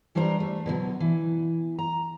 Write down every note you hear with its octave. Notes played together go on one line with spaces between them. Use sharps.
E3 G3 D4 C5 A5 A#5
A3
B2 D3 E3 F#3
E3
A#5